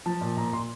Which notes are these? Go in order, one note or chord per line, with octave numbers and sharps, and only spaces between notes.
F3 A5
A#2
A#2 A#5
A#2 C6